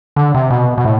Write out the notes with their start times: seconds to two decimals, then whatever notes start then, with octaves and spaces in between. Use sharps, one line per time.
0.16 D3
0.34 C3
0.50 B2
0.78 B2
0.85 A2